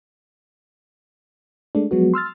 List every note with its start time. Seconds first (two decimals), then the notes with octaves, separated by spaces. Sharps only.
1.75 G#3 A3 D4
1.91 F3 F#3 G#3 B3 F#4
2.14 C6 E6 F6 A6